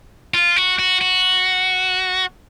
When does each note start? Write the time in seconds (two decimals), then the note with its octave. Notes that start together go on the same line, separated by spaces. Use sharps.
0.34 F4
0.56 F#4
0.79 F#4
1.01 F#4